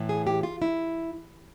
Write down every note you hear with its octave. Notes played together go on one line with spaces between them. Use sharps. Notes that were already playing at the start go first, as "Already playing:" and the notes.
Already playing: A2 E3
G#4
G4
F4
E4